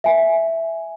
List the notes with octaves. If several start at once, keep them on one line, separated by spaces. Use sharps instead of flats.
E5 G#5